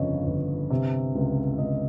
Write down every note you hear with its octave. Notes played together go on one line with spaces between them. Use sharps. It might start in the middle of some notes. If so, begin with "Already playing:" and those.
Already playing: G1 F2 C#3 C#5 D#5
G1
C3
C#2
C#2 D#5